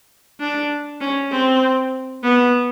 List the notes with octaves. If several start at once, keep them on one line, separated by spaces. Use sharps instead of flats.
D4
C#4
C4
B3